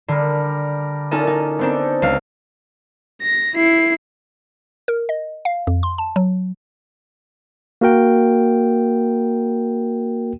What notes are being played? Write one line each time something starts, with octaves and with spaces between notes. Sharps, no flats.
D3 G3 D4 A#4
A#2 A#3 C#4 D#4 A4 D#5
D#4
B3 C4 D4 D#4 A4
C#2 F5 F6
A#6
E4 C7
A#4
D#5
F5
F2
C6
A5
F#3
A#3 F#4 A#4 G5